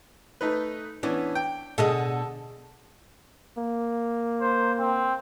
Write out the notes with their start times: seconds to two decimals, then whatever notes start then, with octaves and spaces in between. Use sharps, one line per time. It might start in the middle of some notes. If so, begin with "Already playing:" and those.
0.41 A3 D#4 B4
1.03 E3 B3 C#4 D4
1.35 G5
1.78 B2 D3 G#4 A4 D#5
3.57 A#3
4.41 C5
4.79 C4